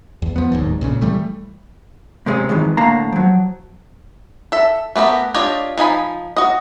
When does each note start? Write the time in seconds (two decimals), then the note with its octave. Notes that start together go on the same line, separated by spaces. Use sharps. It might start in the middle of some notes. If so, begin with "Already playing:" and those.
0.22 E2
0.36 F3 B3
0.52 D1 D#2 G#2
0.81 C#2 A#2 C#3
1.02 E3 G3 A3
2.26 G#2 C3 G#3 C4 C#4
2.49 F2 G#2 D#3 E3
2.77 A2 D3 A#3 F5 A5 A#5
3.12 F3 F#3
4.52 A4 E5
4.96 A3 B3 G4 A#4
5.34 D4 F4 G4 C#5 D#5
5.78 F3 D#4 G#5 B5
6.37 F#4 D#5